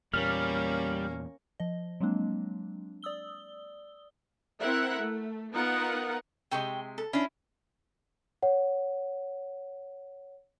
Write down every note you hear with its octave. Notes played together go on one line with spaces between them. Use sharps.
E2 A#2 G3 A#3 C#4 F6
F3 D#5
F#3 G#3 A#3 C4 D4
D5 D#6 E6 G7
C4 E4 A#4 E5 F#5
A3
B3 D#4 F4 A#4 F#5
C3 G#3 G4 G5 C#6
A4
C#4 D4 E4
C#5 F#5